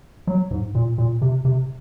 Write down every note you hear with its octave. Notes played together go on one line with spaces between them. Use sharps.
F#3
G#2
A#2
A#2
C3
C3